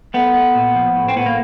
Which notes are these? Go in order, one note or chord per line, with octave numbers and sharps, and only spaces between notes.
A3 B3
A3
A#2
F3
A2
C4
A2 B3
A#3